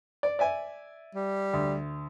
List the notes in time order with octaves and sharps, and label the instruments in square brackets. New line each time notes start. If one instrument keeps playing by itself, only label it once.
[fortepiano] D5
D5 E5 G#5
[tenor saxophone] G3
[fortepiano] D2